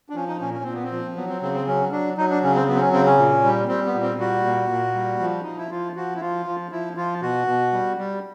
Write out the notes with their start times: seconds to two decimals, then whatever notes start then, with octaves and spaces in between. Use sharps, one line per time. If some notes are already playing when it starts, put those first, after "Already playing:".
0.09 D4
0.15 F3 C#4
0.28 D#4
0.41 A#2 C#4
0.54 C#4
0.64 A#2 C4
0.74 B3
0.83 C4
0.92 F3
1.16 F#3 B3
1.29 C4
1.42 C#3 C4
1.54 C4
1.67 F#3 C#4
1.92 F#3 D4
2.17 F#3 D#4
2.30 D4
2.43 C#3 C#4
2.55 C4
2.68 F#3 B3
2.76 C4
2.80 C#4
2.93 C#3 C4
3.06 C#4
3.18 A#2
3.44 G3
3.68 G3 C4
3.86 B3
3.94 A#2
4.02 C4
4.19 G3 F#4
4.45 A#2
4.69 A#2
4.95 G3
5.20 F3
5.43 F3 D#4
5.57 E4
5.71 F3 F4
5.96 F3 F#4
6.15 E4
6.21 F3 F4
6.46 F3
6.71 F3 E4
6.97 F3 F4
7.22 B2 F#4
7.47 B2
7.73 G3
7.98 G3